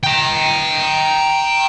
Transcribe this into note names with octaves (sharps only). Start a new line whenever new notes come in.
G5 A#5